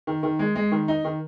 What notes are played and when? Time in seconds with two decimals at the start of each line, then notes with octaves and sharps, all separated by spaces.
0.07 D#3
0.23 D#3
0.39 G#3
0.56 G#3
0.72 D#3
0.88 D#4
1.04 D#3